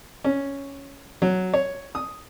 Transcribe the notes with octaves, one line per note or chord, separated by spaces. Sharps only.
C#4
F#3
C#5
D#6